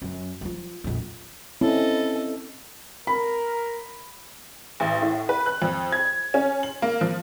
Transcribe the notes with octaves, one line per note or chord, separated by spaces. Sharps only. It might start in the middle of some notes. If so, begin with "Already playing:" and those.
F#2
F3 F#3
A#1 F2
C4 C#4 E4 A4 D#5
A#4 B5
A1
A2
B4
F#6
F2
G#6
C#4
F#7
A#3
F3